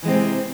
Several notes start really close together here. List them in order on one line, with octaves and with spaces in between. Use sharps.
E3 G#3 C4 C3